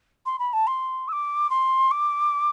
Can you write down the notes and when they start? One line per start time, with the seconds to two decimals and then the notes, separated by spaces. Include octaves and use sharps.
0.26 C6
0.39 B5
0.53 A5
0.67 C6
1.08 E6
1.12 D6
1.50 C6
1.91 D6